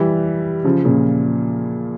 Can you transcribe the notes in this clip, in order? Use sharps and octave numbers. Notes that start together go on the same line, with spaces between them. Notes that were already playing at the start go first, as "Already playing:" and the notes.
Already playing: E3 G3
C#3 F3
A#2 C#3